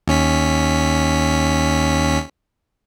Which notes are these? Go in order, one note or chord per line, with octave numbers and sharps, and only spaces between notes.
D#2 C#4 B6